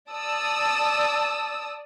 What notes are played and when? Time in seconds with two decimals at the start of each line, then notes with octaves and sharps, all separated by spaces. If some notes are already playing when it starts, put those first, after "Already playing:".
0.12 D5 A5 D#6 E6